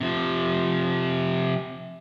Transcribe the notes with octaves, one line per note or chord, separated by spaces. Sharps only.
C3 F3